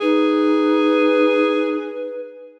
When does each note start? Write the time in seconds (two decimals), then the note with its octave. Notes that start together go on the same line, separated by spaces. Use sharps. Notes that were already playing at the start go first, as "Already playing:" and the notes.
0.01 D#4 G#4 B4